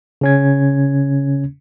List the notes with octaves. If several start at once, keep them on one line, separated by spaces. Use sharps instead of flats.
C#3 C#4 G#6